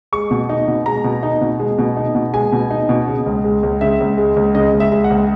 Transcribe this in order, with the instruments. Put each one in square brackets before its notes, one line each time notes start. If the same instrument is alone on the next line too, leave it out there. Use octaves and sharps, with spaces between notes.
[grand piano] G#3 C#6
B2
D#4
B2
G#3 A#5
B2
D#4
B2
G#3
B2
D#4
B2
G#3 G#5
B2
D#4
B2
C#3
C#2
G#3
C#2
C#3 E5
C#2
G#3
C#2
C#3 D#5
C#2
E5
G#3
F#5
C#2